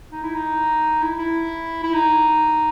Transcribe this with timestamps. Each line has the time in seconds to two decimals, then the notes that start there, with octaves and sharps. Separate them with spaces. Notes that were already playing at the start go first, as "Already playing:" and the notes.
0.12 D#4
0.23 E4
0.34 D#4
1.02 E4
1.18 E4
1.83 E4
1.94 D#4